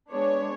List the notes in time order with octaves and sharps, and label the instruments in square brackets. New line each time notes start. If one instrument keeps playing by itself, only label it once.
[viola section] G#3 B3 D4 C#5